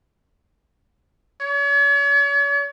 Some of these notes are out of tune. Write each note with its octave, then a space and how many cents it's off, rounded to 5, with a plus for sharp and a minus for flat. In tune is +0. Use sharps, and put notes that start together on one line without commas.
C#5 +40